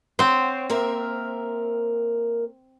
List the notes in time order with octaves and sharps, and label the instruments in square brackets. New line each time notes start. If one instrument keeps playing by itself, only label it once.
[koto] C4 C5 [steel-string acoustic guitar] C#5 F#5
[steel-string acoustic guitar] A#3 A#4 E5